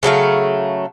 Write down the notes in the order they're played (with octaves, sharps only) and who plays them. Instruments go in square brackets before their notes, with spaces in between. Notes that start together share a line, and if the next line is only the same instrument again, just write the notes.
[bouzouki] C#3 F#3 A3 F5